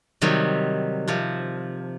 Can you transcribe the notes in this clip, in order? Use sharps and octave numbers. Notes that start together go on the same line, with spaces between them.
C3 D#3 F#3 G3
C3 F3